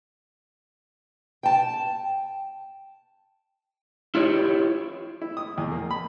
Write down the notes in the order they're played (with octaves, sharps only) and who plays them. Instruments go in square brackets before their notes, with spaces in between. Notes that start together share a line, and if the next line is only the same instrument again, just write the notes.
[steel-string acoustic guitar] G5 A5
[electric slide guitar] E4 F4 G4 C#5
[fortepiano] E4
D#6
E2
A#3
B5